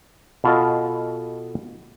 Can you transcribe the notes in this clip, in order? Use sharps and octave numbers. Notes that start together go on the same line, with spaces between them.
B2 F4 A4 D#5